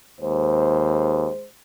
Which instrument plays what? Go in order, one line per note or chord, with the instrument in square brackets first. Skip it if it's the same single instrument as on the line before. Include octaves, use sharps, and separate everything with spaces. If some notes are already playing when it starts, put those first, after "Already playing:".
[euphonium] D#2 [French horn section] G#3 G#4 C5